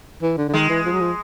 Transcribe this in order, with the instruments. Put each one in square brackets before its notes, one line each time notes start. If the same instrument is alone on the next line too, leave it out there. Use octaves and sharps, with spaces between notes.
[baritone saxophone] E3
D3
D3
[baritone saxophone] D#3 [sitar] G#3
[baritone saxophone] E3
F3
F#3
F3